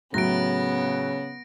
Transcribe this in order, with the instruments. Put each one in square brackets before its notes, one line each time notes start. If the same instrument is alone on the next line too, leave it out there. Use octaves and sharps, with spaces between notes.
[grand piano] A2 F#3 [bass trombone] C#3 [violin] B3 [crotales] A#6 D7